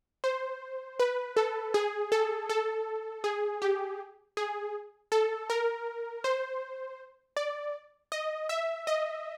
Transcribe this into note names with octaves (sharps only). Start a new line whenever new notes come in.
C5
B4
A4
G#4
A4
A4
G#4
G4
G#4
A4
A#4
C5
D5
D#5
E5
D#5